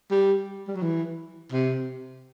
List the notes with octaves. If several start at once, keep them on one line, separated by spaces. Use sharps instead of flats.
G3
G3
F#3
E3
C3